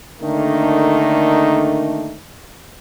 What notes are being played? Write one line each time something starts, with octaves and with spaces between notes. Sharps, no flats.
D3 D#3 A3 A#3 D4 D#4